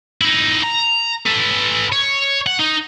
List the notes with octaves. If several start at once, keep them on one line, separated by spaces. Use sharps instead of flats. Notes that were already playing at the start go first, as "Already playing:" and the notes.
D#4 E4
A#5
A4 B4
C#5
F#5
D#4